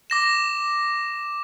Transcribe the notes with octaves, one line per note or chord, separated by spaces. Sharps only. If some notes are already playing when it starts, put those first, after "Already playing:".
D6 A#6 E7